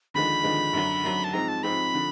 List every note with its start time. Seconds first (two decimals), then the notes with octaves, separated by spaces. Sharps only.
0.14 D#2 D3 F3 G#3 B5
0.43 D#2 D3 F3 G#3
0.73 F#2 D3 F#3
1.04 F#2 D3 F#3
1.24 A5
1.33 G#2 F3 G#3 C4 A#5
1.48 A5
1.63 G#2 F3 G#3 C4 B5
1.94 D3 F3